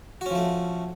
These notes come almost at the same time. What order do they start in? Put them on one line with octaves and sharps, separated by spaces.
F#4 C#4 F3 A3